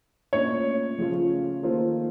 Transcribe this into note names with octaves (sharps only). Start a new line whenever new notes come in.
A#2 A3 C#4 C#5
C#3 F3 A3 C#4 F4
D#3 A#3 F4 A4 C5